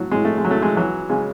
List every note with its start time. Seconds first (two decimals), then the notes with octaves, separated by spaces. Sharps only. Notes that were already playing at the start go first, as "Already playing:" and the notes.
Already playing: A2 F#3
0.12 A2 G#3
0.25 A3
0.38 G#3
0.45 F#3
0.51 A3
0.62 G#3
0.76 E3 F#3
1.10 C#3 G#3